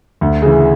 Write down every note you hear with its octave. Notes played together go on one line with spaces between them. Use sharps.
D2
C#3 E3